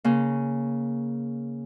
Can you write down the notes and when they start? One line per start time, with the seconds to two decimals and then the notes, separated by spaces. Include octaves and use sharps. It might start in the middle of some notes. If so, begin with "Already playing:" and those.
0.04 C#3 A#3